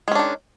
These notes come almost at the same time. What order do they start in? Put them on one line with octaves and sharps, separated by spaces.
G#3 C#4 D4 D#3